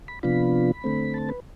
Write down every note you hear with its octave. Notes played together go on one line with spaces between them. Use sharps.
B5
C3 F3 B3 D4 F4 B5
D3 A3 C4
A5
B4